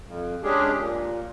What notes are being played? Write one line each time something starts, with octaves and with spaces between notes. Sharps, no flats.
F2
G#3 C#4 D4 G4 G#4
A#2